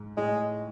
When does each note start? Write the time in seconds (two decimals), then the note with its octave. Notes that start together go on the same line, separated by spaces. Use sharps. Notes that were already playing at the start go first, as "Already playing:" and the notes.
Already playing: G#2
0.17 A2 G#3